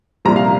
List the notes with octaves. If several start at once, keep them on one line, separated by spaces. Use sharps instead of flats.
C2 A#2 F3 A#3 A#5
F5